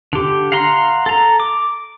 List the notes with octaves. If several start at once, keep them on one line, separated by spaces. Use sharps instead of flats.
D3 G4
F5 F#5 A#5 C6
A4 A#5
D6